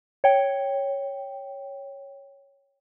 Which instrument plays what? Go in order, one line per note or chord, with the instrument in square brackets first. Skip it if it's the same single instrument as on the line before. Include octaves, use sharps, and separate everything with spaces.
[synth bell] C#5 G5